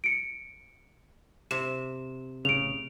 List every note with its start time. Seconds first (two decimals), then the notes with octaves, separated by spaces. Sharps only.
0.04 C#7 D7
1.51 C3 E7
2.45 A1 C#3 D7 F7